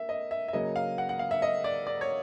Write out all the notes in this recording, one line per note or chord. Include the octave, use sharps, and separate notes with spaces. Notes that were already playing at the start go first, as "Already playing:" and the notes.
Already playing: A#3 E5
D#5
E5
E5
C#3 F#3 A#3 D#5
F5
F#5
F#5
F5
E5
D#5
D5
D5
C#5